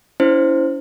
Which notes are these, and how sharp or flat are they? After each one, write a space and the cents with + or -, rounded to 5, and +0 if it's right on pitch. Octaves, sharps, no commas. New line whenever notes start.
C#4 +40 E4 +0 C5 +0